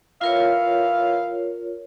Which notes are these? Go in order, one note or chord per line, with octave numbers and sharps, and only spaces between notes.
E3 F4 A#4 C#5 E5 F5